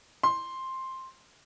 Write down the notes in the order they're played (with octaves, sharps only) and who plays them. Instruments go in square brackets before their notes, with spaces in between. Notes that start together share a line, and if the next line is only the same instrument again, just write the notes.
[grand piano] C6